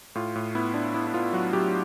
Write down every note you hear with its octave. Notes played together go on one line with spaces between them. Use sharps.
A2 F4
A2
B3 E4
D4
B3 E4
E4
B3 F4
F#3 F#4
F#3 G4